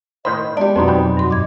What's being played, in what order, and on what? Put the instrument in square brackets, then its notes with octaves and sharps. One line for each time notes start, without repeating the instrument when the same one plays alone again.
[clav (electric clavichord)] A2 D#3 C5 [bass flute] D#5 [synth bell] B5 [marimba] C6
[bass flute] G#3 [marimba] B3 [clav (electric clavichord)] D4 [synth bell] G4 D5
[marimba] F2 B2 [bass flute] F#3 [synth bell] C4 D#4 [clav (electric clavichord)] B4 C5 A#5
[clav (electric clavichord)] E2 B4 G5
[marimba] G2 C6 [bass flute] F#3
[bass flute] D#5 [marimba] D6 G#6